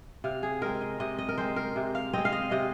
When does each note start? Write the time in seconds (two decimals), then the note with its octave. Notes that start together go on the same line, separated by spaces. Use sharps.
0.24 C3 F5
0.43 G#4
0.62 G#3 C4 A#4
0.81 D#5
1.00 C3 D#5
1.18 D#5
1.29 A#4
1.38 G#3 C4 C5
1.56 A#4
1.76 C3
1.95 F5
2.13 G#3 C4 D#5
2.25 F5
2.33 D#5
2.51 C3 D#5